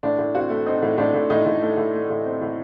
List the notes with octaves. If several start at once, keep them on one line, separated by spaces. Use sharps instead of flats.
A2 D4
A2
C4 F#4
A3
C4 D#4
A2
A2 D4
A2
A2 D#4
A2
A3
A2
A3
A2
C4
A2